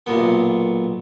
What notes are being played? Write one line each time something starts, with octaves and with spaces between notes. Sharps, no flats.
B1 A#2 B3